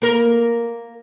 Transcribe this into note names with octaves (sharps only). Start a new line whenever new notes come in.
A#3 A#4